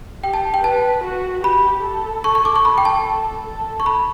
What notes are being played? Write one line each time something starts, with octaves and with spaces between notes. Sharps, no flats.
G4 G5
A5
G5
B4 A5
F#4
G4 B5
A4
C#6
C#6
D6
C#6
A4 B5
G5
A5
A4
C#6
B5